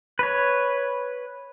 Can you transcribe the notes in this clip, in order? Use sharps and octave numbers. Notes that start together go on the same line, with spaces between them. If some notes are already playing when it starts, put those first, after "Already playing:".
B4 C#5